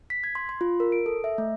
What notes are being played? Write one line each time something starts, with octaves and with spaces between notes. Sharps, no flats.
B6
G#6
C6
C6
F4
A#4
D7
A4
E5
A3